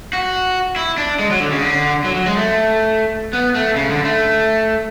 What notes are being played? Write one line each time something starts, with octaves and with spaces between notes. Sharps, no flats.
F#4
E4
D4
G#3
F#3
D3
C#3
D3
F#3
F#3
G#3
A3
B3
A3
C#3
D3
A3